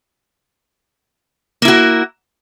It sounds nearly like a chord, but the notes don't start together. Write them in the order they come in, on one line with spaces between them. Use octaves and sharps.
A#3 E4 F#4